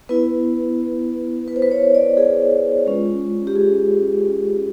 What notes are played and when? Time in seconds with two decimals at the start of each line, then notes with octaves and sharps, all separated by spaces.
0.09 B3 E4 B4
1.48 B4
1.56 C5
1.62 B4
1.71 C#5
1.95 D5
2.17 G#4
2.87 G#3 C#4 F4
3.47 G4
3.56 G#4